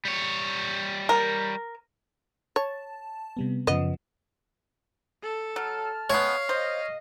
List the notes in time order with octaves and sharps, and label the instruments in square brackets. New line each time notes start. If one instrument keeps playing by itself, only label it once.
[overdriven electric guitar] G3 C#5
[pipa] A#4
[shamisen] C#5 [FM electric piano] A5
[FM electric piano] C3 G3 B3
[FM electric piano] F#2 C#3 F3 [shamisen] B3 D#5
[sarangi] A4
[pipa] F#3 [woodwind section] A5 F6
[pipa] G#3 B3 [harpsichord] C#5 [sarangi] F5
[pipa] C5 [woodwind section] D#5